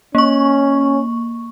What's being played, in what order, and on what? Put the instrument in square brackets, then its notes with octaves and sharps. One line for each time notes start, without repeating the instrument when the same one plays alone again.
[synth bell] A#3 C#6 [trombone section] C#4